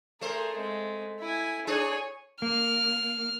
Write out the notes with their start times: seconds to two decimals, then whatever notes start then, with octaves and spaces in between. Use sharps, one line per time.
0.21 A3 G#4 A#4 C5
0.56 G#3 C4
1.19 E4 G#5
1.67 D4 G#4 C#5 G#5
2.42 A#3 F6